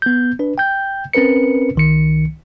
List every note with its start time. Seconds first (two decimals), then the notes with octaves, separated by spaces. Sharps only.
0.02 B3 G6
0.39 D4 B4
0.58 G5 G6
1.13 C4 C#4 A#4 B4 C#7
1.75 C2 D#3 C#7